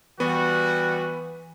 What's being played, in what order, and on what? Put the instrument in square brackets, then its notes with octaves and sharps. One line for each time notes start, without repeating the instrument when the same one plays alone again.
[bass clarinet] E3 [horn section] G3 F#4 [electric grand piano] B3